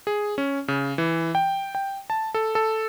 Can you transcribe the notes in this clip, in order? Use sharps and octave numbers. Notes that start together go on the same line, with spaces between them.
G#4
C#4
C#3
E3
G5
G5
A5
A4
A4